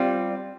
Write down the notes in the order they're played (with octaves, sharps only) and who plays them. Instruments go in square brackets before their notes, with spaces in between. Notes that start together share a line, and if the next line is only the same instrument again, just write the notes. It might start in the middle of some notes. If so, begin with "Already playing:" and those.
Already playing: [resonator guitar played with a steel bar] G3 C4 F4 [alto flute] D5